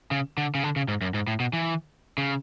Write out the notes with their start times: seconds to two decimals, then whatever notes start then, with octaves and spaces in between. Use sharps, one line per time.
0.11 C#3
0.38 D3
0.55 C#3
0.63 D3
0.76 C#3
0.88 G#2
1.01 F#2
1.14 G#2
1.27 A2
1.40 B2
1.53 E3
2.18 C#3